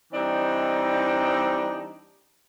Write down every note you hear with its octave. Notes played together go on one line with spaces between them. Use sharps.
E3 G3 C4 D4 D#4